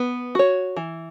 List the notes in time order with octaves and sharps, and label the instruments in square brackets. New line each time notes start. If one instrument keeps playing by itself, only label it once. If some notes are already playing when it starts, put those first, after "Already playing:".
Already playing: [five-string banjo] B3
F#4 C#5
E3